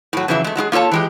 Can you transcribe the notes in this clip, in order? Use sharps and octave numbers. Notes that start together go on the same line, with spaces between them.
A2 F#3
F2 C#3 E3 F#3 E5
G#3 A3
F#3 G#3 F4 G#4
A#3 F4 A4 C#5 A5
E3 G#3 G4